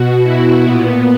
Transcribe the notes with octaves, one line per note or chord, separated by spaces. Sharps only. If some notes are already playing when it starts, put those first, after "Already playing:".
Already playing: B2 F#4
E4
A#2 B3